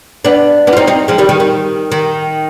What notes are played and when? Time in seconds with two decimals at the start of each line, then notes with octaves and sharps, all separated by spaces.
0.25 B3 D4
0.67 B3 D4
0.73 F4
0.77 C4 D#4
0.87 C4 D#4
1.08 F3 G#3
1.18 D#3 G3
1.29 D#3
1.40 D#3
1.92 D#3